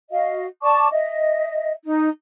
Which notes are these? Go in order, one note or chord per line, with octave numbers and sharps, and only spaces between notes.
F#4 D#5 F5
D5 A5 C#6 D6
D#5 E5
D#4